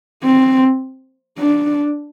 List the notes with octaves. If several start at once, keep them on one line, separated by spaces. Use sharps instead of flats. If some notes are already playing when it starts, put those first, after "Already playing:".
C4
D4